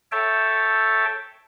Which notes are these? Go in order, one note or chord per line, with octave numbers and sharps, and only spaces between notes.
A4 C#5 E5 G5 A5